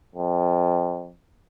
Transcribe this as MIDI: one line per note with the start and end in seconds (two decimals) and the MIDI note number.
0.15 1.11 41